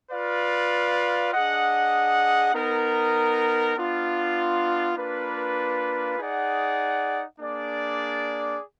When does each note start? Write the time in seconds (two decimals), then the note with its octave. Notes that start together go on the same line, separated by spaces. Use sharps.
0.12 F4 B4 D5 F5
1.33 D4 G#4 D#5 F#5
2.54 B3 D#4 A#4
3.76 B3 D4 F4
4.97 A#3 D4 F4 B4
6.19 D#4 G#4 D5 F#5
7.40 A#3 D4 G#4 D5